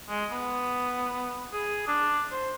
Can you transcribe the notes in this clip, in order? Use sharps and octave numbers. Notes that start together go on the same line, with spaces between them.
G#3
B3
G#4
D4
C5